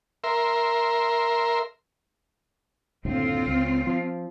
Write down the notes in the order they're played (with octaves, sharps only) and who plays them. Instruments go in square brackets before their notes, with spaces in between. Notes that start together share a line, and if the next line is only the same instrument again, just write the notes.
[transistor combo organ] A#4 E5 C6
[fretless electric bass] F#1 D2 A2 [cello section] C4 F4
[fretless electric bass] C#2
F3